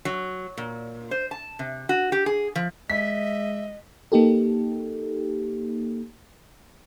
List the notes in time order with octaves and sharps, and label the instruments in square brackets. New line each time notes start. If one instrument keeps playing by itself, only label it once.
[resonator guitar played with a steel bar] F#3
A#2
C5
A5
C3
F#4
G4
G#4
F3
[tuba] G#3 [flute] D#5 [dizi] E5 [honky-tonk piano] B6
[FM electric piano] A#3 D#4 G4 A4